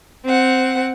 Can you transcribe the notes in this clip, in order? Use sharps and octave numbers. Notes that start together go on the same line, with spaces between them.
C4 F#5